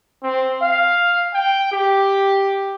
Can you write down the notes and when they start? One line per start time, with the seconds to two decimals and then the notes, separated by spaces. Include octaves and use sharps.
0.23 C4
0.63 F5
1.34 G5
1.72 G4